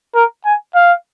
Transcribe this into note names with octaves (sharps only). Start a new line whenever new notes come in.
A#4
G#5
F5